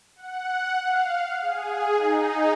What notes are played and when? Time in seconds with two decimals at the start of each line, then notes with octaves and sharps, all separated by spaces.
0.16 F#5
0.81 F5
1.42 G#4
1.95 D#4